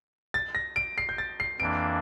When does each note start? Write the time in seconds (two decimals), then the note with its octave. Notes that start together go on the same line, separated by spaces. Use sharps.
0.34 A6
0.55 A#6
0.76 D7
0.98 C7
1.09 G6
1.18 A6
1.40 C7
1.60 F2 E3 A#3 D4 D7